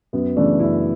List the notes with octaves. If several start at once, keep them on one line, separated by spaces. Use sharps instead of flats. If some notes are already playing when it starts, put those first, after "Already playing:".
F#2 B3
C#3 E3 A3 D4
F#2 E4